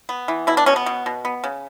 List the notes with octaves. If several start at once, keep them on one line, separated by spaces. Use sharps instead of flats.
B3
E3
B2 E4
D4
B2 C#4
B3
B2
B2
B3
C#3